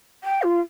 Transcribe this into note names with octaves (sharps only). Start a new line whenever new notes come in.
G5
F4